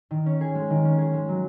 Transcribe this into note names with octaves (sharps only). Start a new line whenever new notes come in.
D#3
C#4
G#4
G#3
D#3
C#4
G#4
G#3
F#3